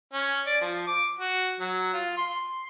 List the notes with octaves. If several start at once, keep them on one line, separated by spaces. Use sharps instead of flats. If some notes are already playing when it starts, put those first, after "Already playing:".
C#4
D5
F3
D6
F#4
F#3
F4
C6